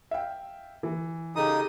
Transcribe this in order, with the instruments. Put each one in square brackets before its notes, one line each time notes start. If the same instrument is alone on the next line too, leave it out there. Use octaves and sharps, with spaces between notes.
[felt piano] E5 F5 G5
E3
[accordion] C#3 D#4 D#6 [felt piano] G4 A4 A#5